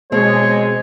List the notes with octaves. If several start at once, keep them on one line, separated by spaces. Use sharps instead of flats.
B2 F3 G#3 C4 C#5